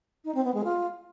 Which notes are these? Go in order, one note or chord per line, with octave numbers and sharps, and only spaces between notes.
D#4
C4
B3
G#3
F4